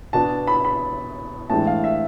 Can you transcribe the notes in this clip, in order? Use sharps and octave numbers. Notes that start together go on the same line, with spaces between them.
B2 B3 D4 A5
B5
B5
A2 E3 G#3 D4 A5
F5
E5